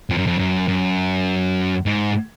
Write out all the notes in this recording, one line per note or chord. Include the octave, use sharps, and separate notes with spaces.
F2
F#2
F2
F#2
F#2
G#2